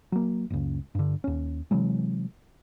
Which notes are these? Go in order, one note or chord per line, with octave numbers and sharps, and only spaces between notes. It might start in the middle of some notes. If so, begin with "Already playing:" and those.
F#3 A#3
F#1 C#2
G2 D3
D#2 C#4
C3 E3 F#3 G#3